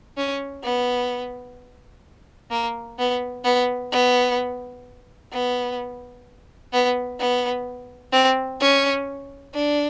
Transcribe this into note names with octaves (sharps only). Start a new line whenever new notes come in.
C#4
B3
A#3
B3
B3
B3
B3
B3
B3
C4
C#4
D4